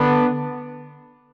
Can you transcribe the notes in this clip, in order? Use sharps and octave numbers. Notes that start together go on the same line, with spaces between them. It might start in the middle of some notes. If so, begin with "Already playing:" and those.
Already playing: D3 B3 D4